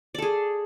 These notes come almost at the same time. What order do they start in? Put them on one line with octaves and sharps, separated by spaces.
D5 A4 G#4